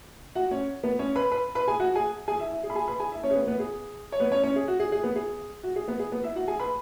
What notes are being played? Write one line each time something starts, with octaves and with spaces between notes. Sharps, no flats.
F#4 F#5
C#4 C#5
B3 B4
C#4 C#5
B4 B5
B4 B5
B4 B5
G#4 G#5
F#4 F#5
G#4 G#5
G#4 G#5
E4 E5
E4 E5
G#4
B5
G#4 G#5
B4 B5
G#4 G#5
E4 E5
C#4 C#5
G#4
B3 B4
B3 B4
G#4
C#5
B3 B4
C#4 C#5
C#4 C#5
G#4
F#4
G#4
G#4
B3 B4
G#4
F#4
G#4
B3 B4
G#4
B3 B4
E4 E5
F#4 F#5
G#4 G#5
B4 B5